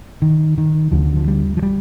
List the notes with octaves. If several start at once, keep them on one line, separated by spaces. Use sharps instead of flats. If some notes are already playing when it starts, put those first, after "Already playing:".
D#3
D#3
D2 D3 F3
F3
G3
F3
G3